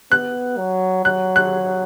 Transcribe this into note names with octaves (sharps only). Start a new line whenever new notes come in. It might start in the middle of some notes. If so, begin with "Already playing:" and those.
B3 F#6
F#3
F#3 F#6
F#6